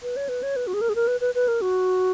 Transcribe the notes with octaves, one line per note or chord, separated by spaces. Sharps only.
B4
C#5
B4
C#5
B4
F#4
G#4
A#4
G#4
A#4
B4
B4
B4
A#4
F#4